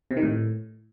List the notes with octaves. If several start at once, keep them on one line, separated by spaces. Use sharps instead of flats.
C3
D#3
A2